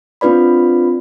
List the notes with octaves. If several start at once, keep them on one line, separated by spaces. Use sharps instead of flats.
C4 D4 F4 B4 D5 B5